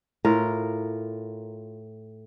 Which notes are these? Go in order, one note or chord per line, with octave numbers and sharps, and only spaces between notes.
A2 F4 A#4